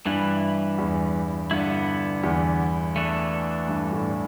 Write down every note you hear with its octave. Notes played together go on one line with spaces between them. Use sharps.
G2 E3 G3 E4 B4
E2
G2 D3 B3 E4
E2
E3 A3 D4 A4
G2
A2